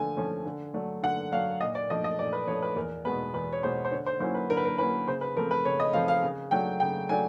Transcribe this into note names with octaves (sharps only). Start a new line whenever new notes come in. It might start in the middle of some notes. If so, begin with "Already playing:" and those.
Already playing: D3 F3 A3 G#5
F3 A3 C#4
D3
F#3 A3 D4
D3 F#5
F#3 A3 D4 F5
A#2 D#5
D5
F3 A3 D4 D#5
D#5
A#2 D5
B4
F3 A3 D4 C#5
B4
E2 A#4
B2 G#3 B3 B4
E2 B4
C#5
B2 G#3 B3 C5
C5
D3 C#5
C5
F#3 A#3 C#4 E4 C5
B4
D3 A#4
B4
A#4
F#3 A#3 C#4 E4 B4
C#3 C5
B4
F3 A3 C4 A#4
B4
C#3 C#5
D#5
F3 A3 C4 F5
F5
C#3
F#3 A3 D4 G5
C#3 G5
F#3 A3 D4 G#5